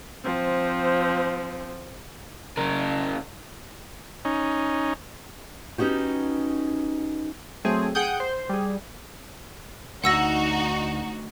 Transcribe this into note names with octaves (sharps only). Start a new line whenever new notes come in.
F3 C4
C#3 A#4
C#4 D#4
B3 C#4 D#4 F#4 G4
F#3 A3 C4 G#4
G#4 F#5 G5 D#6 G6
C5
G3 G#4
D2 D#4 F#4 F#5 E6 A#6